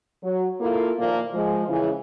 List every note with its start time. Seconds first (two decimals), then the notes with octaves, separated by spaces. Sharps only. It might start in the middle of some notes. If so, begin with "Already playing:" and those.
0.23 F#3
0.60 A#3 E4 F4 A4
0.99 A#2 D#3 F3 A#3
1.33 F3 G#3
1.69 C#3 E3